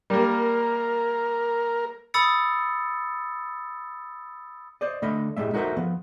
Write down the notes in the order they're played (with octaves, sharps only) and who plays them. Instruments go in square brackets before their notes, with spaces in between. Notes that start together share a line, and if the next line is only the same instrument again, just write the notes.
[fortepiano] G3 A#3 [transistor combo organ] A#4
[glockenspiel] B5 D#6 E6 A6 C#7
[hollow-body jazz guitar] C5 D5 D#5
D3 A3 D#5 B5
A2 G3 G#3 E5
D#4 F#4 A4 A#4 C5 E5
F3 B3